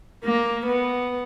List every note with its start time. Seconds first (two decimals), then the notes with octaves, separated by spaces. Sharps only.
0.24 A#3
0.66 B3